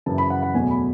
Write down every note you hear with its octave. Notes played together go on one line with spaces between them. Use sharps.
F#2 C#3 E3 A5
B5
F#5
F#5
E2 B2 F#3 A3 G#5
B5